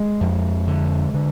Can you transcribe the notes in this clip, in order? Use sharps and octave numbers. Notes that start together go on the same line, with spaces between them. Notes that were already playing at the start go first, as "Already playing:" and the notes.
Already playing: G#3
F2
D3
D3